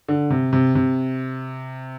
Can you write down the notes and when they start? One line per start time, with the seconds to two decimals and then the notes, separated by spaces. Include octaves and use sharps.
0.08 D3
0.30 C3
0.53 C3
0.75 C3